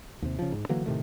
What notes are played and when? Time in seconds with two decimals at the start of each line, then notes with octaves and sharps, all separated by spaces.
0.22 D#2 C3
0.39 C#3 F3
0.52 G#2
0.69 D3 E3 F#3 A#3
0.86 A2 C3 D#3 A3